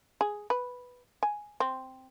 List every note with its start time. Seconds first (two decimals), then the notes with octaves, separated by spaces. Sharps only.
0.21 G#4
0.50 B4
1.23 G#5
1.60 C4